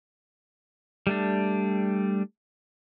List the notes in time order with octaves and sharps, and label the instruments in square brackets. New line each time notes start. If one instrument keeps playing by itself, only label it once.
[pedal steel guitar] G3 A3 D4